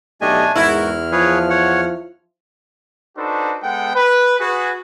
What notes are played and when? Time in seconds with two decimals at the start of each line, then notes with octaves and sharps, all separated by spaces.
0.21 B1 A3 D4 G4 D#5 G#5
0.56 E2 G#2 E4 F#4 A#4 F6
1.12 F3 G#4 B4 C#5
1.50 C#5 F#5
3.17 D4 D#4 F#4 A4 B4 C5
3.63 G#3 B3 A4 F#5 G5
3.94 B4
4.39 F#4 G#4 B4